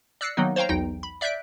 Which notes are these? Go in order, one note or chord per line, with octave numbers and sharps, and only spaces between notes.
D5 E6 F#6 A#6 C7 C#7
D#3 F#3 A#3 B3 D#4
C5 C#5 F5 G5 A#5
B1 E2 D#4 G5
B5
D5 E5 F#6 G6 B6 D7